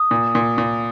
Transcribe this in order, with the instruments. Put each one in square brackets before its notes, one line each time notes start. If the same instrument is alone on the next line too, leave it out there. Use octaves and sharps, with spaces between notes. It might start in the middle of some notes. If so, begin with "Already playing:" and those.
Already playing: [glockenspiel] D#6
[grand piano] A#2
A#2
A#2